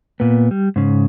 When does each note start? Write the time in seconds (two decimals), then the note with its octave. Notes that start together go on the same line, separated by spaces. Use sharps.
0.20 A#2 B3
0.51 G3
0.76 G#2 C#3